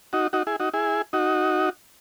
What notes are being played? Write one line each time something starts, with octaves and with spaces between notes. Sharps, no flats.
D#4 F#4
D#4 F#4
E4 G#4
D#4 F#4
E4 G#4
D#4 F#4